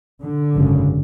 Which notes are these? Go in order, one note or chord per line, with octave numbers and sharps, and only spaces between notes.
D3
G#1 F#2 C#3